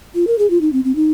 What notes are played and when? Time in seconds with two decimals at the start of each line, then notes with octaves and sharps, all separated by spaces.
0.15 F4
0.27 A#4
0.38 G#4
0.50 F4
0.61 D#4
0.73 C4
0.84 C4
0.95 D#4